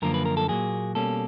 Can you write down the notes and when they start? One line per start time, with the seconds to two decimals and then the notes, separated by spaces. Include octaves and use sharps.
0.02 F#2 D3 F3 A#3 A#4
0.14 B4
0.25 A#4
0.37 A4
0.48 A#2 F#3 A#3 G#4
0.95 B2 G3 A#3 C#4 A4